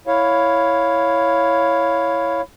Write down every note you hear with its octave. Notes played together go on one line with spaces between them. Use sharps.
E4 C#5 F5